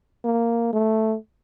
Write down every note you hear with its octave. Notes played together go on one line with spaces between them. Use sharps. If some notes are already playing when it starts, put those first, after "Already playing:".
A#3
A3